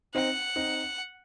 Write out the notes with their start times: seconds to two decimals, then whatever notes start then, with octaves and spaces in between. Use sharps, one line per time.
0.15 C4 D#4 F#5
0.56 C4 D#4